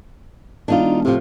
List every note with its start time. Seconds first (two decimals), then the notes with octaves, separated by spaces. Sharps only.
0.68 E1 D4 D#4 F4
1.05 A2 C3 F3